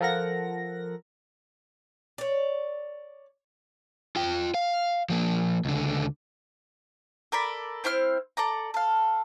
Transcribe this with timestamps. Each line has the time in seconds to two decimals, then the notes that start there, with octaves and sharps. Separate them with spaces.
0.01 F3 A4 A#4 F#5 A#6
2.18 C#5 D5
4.16 F4 G5
4.54 F5
5.10 F3 A#3
5.65 C#2 D3
7.32 A4 A#4 D5 B5
7.84 C4 E4 C5 F6
8.37 A4 D5 A#5
8.74 A4 F5